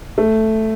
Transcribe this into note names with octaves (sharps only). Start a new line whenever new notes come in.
A3